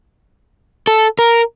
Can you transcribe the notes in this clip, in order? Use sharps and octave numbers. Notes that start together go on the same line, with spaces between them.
A4
A#4